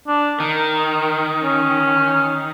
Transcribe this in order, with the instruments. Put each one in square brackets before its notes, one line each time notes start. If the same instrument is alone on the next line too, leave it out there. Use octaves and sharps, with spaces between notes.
[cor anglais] D4
[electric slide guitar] D#3 [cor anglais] A#4
[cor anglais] C#4